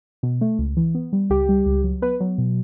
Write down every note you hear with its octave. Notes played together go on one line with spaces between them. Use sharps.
B2
A3
C#2
E3
B3
G3
C#2 G4
G3
C#2
F#3
B3 B4
F#3
B2